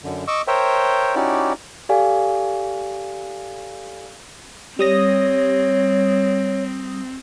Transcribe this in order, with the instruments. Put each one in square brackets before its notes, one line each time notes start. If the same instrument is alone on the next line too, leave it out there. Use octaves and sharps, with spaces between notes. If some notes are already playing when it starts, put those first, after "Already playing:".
[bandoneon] F#2 D3
D#5 C#6 D6 E6
A#4 C5 C#5 E5 G5
C#4 D#4 E4 F#4 G4 D5
[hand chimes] G4 A4 D5 F5 G#5
[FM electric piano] G3 D#6 A#6 [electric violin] C4 [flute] C#5